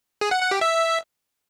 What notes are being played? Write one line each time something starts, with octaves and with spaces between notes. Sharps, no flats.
G#4
F#5
F#5
G4
E5